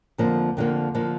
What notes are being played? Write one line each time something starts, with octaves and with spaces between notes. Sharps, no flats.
F2 D3 F3 A#3
F2 D3 F3 A#3
D3 F3 A#3